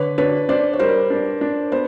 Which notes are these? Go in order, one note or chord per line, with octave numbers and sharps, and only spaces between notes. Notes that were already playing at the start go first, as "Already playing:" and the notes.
Already playing: D3 B4 C#5
D4 B4 C#5
D4 C5 D5
C#5
G3 A#4 C5
D4
D4
B3 C5